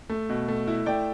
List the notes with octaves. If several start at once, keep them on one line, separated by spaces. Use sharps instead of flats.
A3
B2
A3
E4
A3 D5 G5